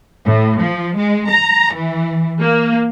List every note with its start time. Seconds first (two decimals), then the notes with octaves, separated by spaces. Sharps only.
0.25 A2
0.60 F3
0.96 G#3
1.29 A#5
1.74 E3
2.41 A#3